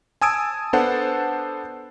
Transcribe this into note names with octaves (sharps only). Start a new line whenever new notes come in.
G#5 A5 D#6 E6 G#6 D7
B3 D4 A4 C5 F#5 A5